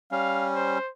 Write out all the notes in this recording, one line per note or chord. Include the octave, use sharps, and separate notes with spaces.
G3 C#4 F5
C5